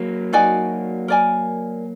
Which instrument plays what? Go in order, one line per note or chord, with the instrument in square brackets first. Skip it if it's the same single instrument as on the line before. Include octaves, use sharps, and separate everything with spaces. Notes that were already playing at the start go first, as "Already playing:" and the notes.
Already playing: [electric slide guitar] F#3 A#3
[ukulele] D#4 F#4 D5 G#5
A#4 D5 G#5